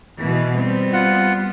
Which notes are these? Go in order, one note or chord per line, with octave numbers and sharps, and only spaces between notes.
B2 E3
G3 B3 C4
F4 F#5